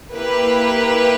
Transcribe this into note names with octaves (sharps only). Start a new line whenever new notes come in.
A#3 E4 G4 B4